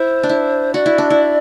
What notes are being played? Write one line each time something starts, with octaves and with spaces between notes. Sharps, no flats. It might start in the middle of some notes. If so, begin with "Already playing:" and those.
Already playing: E4 C5
D4
E4
F#4 D5
E4
D4
E4